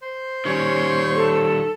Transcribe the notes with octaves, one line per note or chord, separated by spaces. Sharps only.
C5
D#3 G3 C#4 C#5
A4